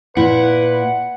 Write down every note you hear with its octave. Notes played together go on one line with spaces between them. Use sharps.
A#2 E4 B4 F#5